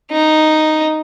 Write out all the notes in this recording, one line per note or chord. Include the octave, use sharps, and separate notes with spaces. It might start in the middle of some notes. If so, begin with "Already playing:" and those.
D#4